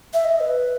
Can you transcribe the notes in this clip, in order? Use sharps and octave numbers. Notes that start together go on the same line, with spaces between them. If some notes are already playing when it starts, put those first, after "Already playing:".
E5
D#5
B4